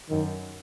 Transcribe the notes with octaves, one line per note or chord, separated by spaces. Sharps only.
F#2 D#3